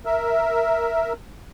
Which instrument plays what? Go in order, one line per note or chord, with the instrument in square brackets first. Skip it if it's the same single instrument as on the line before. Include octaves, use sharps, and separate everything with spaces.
[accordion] A#4 E5